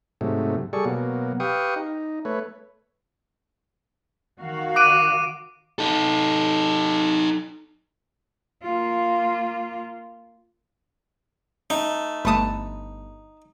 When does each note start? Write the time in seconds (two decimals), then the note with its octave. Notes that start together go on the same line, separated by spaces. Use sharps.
0.21 G#2 C3 F#3 A3
0.73 G3 G#4 A4 D5 C#6
0.85 B2 F#3 A#3
1.40 G4 B4 F5 G5 C#6 D#6
1.76 D#4
2.25 A3 B4 C#5
4.38 D#3 F#4 F5
4.76 D6 F#6 D7 D#7
5.79 D#4 A4
8.63 A#3 F4
11.70 A3 D#4
12.25 G1 A3 B4 A5 D#6